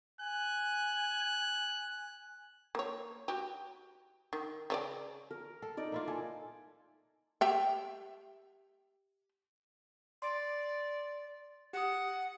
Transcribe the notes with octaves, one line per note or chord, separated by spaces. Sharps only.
G#5 F#6
A#3 C#5
F#4 G4
D#3
C#3 C#4 D5
A#4
A4
D#4 D5
A#3 E4 F4
A4 G#5
G4 E5 G5
D5 C6
G4 F#5 D#6